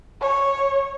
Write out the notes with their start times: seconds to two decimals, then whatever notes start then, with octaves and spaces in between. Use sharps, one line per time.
0.21 C#5